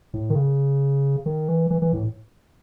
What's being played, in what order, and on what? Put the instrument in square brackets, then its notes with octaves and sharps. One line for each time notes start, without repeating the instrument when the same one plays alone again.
[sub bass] A2
D#3
C#3
D#3
E3
E3
E3
A2